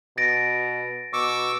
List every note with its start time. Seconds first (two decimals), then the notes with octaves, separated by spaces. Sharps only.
0.18 B2 A6 A#6 D7
1.13 B2 C#6 D6 E6